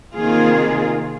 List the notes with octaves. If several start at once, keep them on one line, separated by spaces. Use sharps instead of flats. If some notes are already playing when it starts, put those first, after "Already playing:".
C3 D#3 A#3 F4 G#4